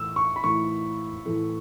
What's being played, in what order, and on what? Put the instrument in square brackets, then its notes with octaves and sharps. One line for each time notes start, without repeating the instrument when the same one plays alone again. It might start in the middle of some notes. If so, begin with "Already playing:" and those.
Already playing: [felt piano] A2 E3 A3 E4 [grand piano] E6
[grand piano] C#6
B5
[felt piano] A2 E3 A3 E4 [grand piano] C#6
[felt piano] A2 E3 A3 E4